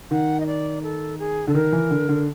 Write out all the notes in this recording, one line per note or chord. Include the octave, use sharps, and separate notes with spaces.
D#3 F#5
D#5
D5
A4
G#4
D3 A4
D#3 A#4
E3
D3
D3